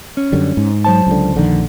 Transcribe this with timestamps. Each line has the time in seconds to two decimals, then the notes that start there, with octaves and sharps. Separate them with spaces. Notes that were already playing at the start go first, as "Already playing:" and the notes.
0.17 C#4
0.32 F#2 D3 G3
0.57 G#2
0.85 F#3 C5 A5
1.07 C#2 D3
1.36 A#1 F2 D3 D#3